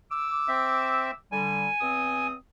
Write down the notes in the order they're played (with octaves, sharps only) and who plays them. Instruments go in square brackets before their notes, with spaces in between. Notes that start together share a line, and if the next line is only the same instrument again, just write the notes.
[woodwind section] D6 E6
[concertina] C4 E5
[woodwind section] D3 G3 [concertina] G#5
[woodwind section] E2 C4 D#6